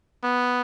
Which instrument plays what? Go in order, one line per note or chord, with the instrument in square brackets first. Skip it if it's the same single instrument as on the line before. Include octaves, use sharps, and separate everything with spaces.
[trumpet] B3